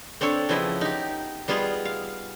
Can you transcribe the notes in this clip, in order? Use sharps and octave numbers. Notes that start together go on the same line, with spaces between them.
C4 D4 A4 C#5
C#3 F3 B3 E4 D#5
D#4 G4
G3 B3 F4 G#4 D#5 F5
F5